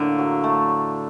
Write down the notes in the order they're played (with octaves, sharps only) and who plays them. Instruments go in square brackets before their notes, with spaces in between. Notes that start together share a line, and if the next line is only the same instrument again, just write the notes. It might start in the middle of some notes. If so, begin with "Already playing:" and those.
Already playing: [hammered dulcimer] A2 A#3 [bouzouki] D3
[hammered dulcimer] F#3
A3